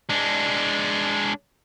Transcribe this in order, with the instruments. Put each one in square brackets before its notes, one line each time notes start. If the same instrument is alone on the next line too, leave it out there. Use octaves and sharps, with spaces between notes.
[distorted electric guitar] G#3 D4